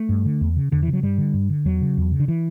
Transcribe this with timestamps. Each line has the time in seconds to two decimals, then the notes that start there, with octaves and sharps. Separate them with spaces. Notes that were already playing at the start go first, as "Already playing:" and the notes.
Already playing: A3
0.09 G2
0.25 D3
0.41 E2
0.57 C#3
0.71 E2 D3
0.83 E3
0.88 C#3
0.93 F#3
1.03 G2 G3
1.18 D3
1.34 G2
1.50 D3
1.65 E2 F#3
1.82 C#3
1.97 E2
2.12 C#3
2.19 D3
2.28 E3